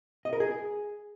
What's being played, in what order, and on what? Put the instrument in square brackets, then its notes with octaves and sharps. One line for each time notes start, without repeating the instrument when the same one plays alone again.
[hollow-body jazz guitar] D#5
A#4
G#4